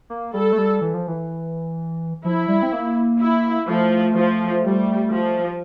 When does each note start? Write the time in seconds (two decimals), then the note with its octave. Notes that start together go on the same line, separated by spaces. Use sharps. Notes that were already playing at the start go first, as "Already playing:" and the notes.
0.10 A#3
0.34 G3 A4
0.53 A3
0.58 G3
0.81 E3
0.94 F3
1.08 E3
2.24 F3 E4
2.48 G3
2.62 C4
2.73 A#3
3.20 E4
3.68 F3 A3
4.15 F3
4.63 G3
5.10 F3